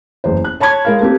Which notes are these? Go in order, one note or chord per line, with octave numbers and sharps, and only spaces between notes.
F#1 E2 C5
F#6
C#5 A5 B5 C#6 G#6
G#3 A#4 F5
A3 A#3 C4 G4